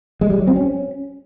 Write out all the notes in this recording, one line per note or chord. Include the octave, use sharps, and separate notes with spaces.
G#3
G3
F#3
C4
C#4